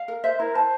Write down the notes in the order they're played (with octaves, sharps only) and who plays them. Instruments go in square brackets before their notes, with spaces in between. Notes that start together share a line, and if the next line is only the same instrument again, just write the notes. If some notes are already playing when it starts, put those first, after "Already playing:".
Already playing: [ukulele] F5
A#4
[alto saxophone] C5 [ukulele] E5
[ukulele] E4 [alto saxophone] A#4
[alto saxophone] C5 [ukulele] A5